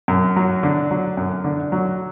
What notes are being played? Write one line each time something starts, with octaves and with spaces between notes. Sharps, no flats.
F#2
F#3
D3
F#3
F#2
D3
F#3